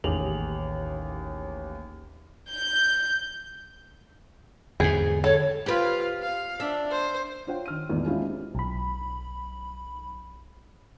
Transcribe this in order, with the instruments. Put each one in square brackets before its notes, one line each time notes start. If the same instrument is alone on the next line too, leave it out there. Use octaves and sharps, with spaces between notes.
[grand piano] A1 D#2 G4 G#4 F7 F#7
[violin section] G6
[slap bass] E2 G#2 [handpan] D3 [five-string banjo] G#4
[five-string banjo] A4 [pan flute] C#5
[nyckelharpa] F4 F5 [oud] G4 B4
[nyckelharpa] F5
[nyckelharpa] D4 [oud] E5
[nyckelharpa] C5
[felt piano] D4 F4 C5 C#5 F#5 G5
D#3 F6 D#7
A#1 E2 A2 D#3 G#3
G#3 C#4 D4 E4 F4 G4
C4
[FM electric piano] B1 B5